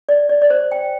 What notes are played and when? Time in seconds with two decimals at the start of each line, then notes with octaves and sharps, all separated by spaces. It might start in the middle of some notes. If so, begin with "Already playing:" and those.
0.09 D5
0.29 D5
0.42 D5
0.50 C5
0.72 G5